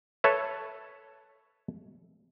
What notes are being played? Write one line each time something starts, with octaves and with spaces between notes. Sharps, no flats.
A4 B4 C#5 E5